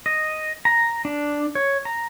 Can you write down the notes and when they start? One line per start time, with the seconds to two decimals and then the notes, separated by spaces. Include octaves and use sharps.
0.06 D#5
0.65 A#5
1.05 D4
1.55 C#5
1.85 A#5